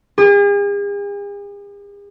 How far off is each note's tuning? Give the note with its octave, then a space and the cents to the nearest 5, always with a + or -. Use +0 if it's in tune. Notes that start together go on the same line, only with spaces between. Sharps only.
G#4 -45